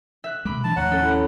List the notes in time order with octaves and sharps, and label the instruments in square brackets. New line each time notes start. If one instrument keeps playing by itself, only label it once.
[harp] E5 F#6
[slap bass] B2 G#3 [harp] B5 D6
[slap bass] E3 F#3 D4 [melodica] A5
[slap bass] D#2 A2 F3 [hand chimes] C#5 A#5 [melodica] F#5
[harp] C#4 A4
[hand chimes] E4 C#5 B5